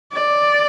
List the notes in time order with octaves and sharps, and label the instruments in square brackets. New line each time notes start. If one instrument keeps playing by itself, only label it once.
[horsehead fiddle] D5